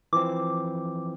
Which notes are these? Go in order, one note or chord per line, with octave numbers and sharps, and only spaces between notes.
E3 F3 C4 D6